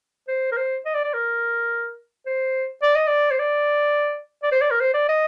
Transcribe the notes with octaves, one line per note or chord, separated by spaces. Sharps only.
C5
A#4
C5
D#5
D5
D5
A#4
C5
D5
D#5
D5
C5
D5
D5
C5
D5
A#4
C5
D5
D#5